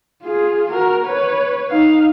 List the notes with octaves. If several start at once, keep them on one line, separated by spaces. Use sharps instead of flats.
F4 G#4
F#4 A#4
B4 C#5
D#4 F5